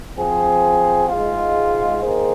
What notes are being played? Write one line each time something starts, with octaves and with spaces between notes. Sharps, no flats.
F3 C4 G#4
G#2 G#3 F4
D#3 A#3 G#4 C5